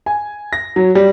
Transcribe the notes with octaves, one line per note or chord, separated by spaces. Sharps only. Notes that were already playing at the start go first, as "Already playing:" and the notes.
G#5
A#6
F#3
G3